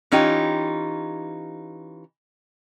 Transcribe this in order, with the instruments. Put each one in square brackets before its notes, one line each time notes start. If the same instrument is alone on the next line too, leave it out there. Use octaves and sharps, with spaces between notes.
[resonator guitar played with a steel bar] E3 C#4 D#4 F4 G4